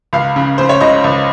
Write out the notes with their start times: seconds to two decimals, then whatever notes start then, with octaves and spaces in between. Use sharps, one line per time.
0.13 C#2 F5
0.36 C#3
0.58 C#3 C5
0.69 C#5
0.81 C#2 D#5
1.04 C#2